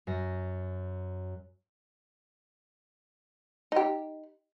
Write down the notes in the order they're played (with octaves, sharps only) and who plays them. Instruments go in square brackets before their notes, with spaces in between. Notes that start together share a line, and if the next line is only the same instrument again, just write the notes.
[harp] F#2 A#6
[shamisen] D#4 G4